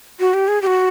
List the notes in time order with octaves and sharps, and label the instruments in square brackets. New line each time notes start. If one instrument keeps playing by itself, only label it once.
[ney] F#4
G4
G#4
G4
F#4